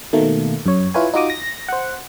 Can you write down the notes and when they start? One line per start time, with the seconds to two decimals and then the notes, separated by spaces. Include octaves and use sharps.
0.13 B2 D#3 A3 A#3
0.66 F#2 C#5
0.94 E4 F4 B4 C#5 G#5
1.14 D#4 F4 F#4 D#5 D6 D#6
1.30 A#6
1.68 C5 F#5